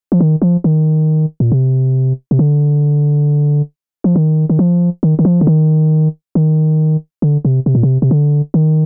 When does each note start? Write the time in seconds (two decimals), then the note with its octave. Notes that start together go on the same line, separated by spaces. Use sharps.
0.12 F3
0.20 D#3
0.42 F3
0.64 D#3
1.40 A#2
1.52 C3
2.31 C3
2.39 D3
4.04 F3
4.16 D#3
4.50 D#3
4.59 F3
5.03 D#3
5.19 D#3
5.25 F3
5.41 D3
5.47 D#3
6.35 D#3
7.22 D3
7.45 C3
7.66 C3
7.75 A#2
7.83 C3
8.02 C3
8.11 D3
8.54 D#3